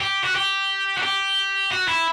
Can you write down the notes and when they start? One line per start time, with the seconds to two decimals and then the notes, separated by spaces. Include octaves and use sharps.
0.01 G4
0.24 F#4
0.35 G4
0.98 F#4
1.03 G4
1.71 F#4
1.88 E4